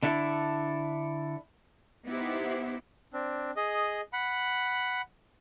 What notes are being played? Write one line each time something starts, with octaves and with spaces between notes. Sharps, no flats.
D3 D4 E4 A4
B3 D#4 E4 G4 C5
C4 D4
G#4 D#5
F#5 B5